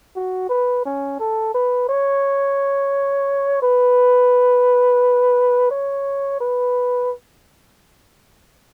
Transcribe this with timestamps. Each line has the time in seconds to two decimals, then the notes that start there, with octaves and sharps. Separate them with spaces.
0.16 F#4
0.50 B4
0.85 C#4
1.20 A4
1.54 B4
1.89 C#5
3.62 B4
5.71 C#5
6.40 B4